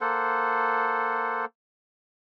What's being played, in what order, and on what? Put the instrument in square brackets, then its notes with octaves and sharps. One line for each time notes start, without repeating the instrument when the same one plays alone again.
[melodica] A#3 A4 C5 F#5